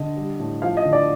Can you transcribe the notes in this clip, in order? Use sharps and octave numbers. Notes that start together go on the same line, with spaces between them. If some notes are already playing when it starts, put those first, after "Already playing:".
Already playing: D3 D#5
G3
A2
F3 F5
D#5
D3
D5